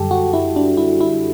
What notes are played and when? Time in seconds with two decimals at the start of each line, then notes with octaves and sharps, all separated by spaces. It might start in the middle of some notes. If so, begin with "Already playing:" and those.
Already playing: F#2 D3 G3 G4 A4
0.11 F#4
0.33 E4
0.56 D4
0.77 E4
1.00 E4